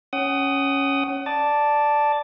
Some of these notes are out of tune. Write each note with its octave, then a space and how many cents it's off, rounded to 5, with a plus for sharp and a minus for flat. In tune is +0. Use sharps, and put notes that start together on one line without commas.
C#4 -5 F#5 +35 D#6 +0
D5 +0 A5 +0